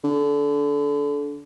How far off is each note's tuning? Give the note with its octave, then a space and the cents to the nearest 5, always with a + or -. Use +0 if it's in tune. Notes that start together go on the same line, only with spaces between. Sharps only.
D3 -25